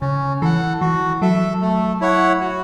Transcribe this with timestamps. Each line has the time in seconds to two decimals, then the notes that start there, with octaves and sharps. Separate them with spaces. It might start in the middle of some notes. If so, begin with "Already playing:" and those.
0.01 C#3 C#4
0.41 E3 A4 F#5
0.81 E3 F#4
1.22 F#3 A4 E5
1.62 A3
2.01 E4 C#5 F#5
2.41 F#4